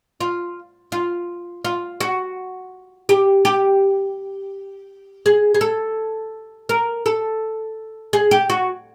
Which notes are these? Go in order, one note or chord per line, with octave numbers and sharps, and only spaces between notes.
F4
F4
F4
F#4
G4
G4
G#4
G#4
A4
A#4
A4
G#4
G4
F#4